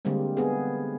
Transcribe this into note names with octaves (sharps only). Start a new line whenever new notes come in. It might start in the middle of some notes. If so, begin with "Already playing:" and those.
D3 G3 G#3 A#3 C4
B3 G#4